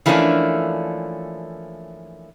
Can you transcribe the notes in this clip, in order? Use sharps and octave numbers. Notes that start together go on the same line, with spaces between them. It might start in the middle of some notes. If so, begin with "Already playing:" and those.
E3 F3 A3 A#3 C#4 D4